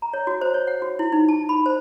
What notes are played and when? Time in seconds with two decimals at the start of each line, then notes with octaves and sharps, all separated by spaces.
0.02 A#5
0.13 C#5
0.27 F#4
0.41 C5
0.54 C#5
0.67 F#5
0.82 F#4
0.99 E4
1.12 D#4
1.29 A5
1.49 B5
1.66 C5